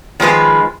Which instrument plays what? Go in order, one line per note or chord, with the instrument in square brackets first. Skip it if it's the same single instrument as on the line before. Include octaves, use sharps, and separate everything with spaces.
[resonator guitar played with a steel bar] D#3 F3 G#3 B4